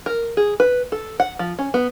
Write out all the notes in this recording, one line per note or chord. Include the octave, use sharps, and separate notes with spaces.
A#4
G#4
B4
A4
F#5
F3
C#4
B3